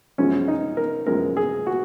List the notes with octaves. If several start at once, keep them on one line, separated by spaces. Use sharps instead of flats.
F#2 F3 G#3 C#4
D#4
A#4
F#2 F3 G#3 A#4
G#4
F#4